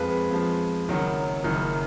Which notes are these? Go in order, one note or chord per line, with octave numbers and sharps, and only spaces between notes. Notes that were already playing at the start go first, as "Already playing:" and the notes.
Already playing: F2 F3 G#3 B4
F2 F3 G#3
F#1 F#2 D#3 F#3
F#1 F#2 D#3 F#3